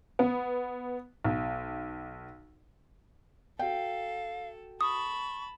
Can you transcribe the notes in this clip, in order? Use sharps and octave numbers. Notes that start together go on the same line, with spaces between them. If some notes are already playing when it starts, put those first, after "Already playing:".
B3
B1
F#4 A4 F5 G5
A5 B5 C#6 D#6